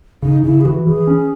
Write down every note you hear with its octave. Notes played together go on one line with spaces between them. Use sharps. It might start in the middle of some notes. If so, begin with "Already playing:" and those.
C#3 D#4
C#3 E4
G#4
E3 F#4
E3 G#4
C#4